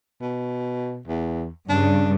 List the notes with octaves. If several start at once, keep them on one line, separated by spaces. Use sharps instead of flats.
B2
E2
G2 C#3 G3 D4